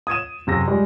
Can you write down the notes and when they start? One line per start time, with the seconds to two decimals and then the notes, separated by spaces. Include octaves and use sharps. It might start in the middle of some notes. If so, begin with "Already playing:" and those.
0.07 D#6 G#6 D#7 E7
0.47 F#2 C3 G#4 A#6
0.67 G3 G#3 G4 G#4